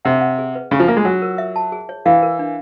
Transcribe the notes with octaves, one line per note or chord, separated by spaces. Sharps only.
C3 F#5
F#5
G#4
B4
C#3 G#4
F3
A#3 F4
G#3
F#3 F#5
A#4
E5
A5
G#4
C#5
E3 F5
A#4
D4